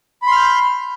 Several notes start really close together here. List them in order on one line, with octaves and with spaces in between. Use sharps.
B5 C6 F6 G6